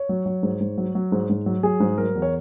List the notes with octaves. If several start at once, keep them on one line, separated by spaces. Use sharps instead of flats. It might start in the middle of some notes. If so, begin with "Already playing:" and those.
Already playing: C#5
F#3
F#3
G#2
G#2
F#3
F#3
G#2
G#2
F#3
F#3 G#4
G#2
F#3 A#4
E2
C#5